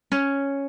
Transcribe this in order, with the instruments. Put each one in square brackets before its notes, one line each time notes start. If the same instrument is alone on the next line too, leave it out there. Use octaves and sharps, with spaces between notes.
[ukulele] C#4